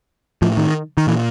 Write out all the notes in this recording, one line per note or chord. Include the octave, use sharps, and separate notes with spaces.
A2 F3
D#3
D#3
A#2 E3